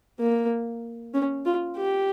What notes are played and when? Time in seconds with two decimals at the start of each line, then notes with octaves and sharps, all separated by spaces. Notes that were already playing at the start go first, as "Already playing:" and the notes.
0.20 A#3
1.14 C#4
1.46 F4
1.77 G4